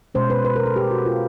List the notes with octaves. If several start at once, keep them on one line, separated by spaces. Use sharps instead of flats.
B2 G#3 C#4 C5
B4
B4
A#4
A4
G4
F#4
F4